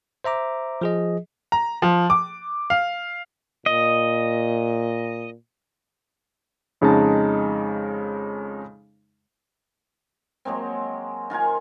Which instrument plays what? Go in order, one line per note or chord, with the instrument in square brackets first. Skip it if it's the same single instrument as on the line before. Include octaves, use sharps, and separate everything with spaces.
[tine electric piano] C5 E5 A#5 D6
F3 G#4 D#5
[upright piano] A#5
F3
D6
F5
[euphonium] A#2 [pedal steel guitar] D#5
[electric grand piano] F2 C#3 G#3 D#4 A5
[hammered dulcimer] F#3 G#3 A#3 C4
D#3 F4 A#4 G#5